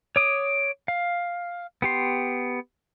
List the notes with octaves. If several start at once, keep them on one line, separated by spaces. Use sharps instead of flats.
C#5 D6 D#6
F5
B3 G4 C6